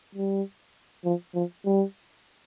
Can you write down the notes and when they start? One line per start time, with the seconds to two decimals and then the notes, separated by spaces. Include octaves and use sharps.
0.15 G3
1.05 F3
1.35 F3
1.65 G3